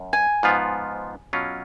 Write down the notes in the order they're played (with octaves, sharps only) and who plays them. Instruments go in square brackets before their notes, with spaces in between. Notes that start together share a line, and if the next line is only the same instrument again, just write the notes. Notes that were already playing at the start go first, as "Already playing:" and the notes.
Already playing: [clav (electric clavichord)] F#2
[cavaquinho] G#5
[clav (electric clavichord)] G#2 F3 B3 F4
B2 F#3 C#4 F4